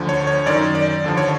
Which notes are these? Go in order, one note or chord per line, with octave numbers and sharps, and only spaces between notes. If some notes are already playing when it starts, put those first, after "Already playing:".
Already playing: D2 D3 F3
C#5
C#5
F#2 D#3 D5
D5
D#2 D3 F3
C#5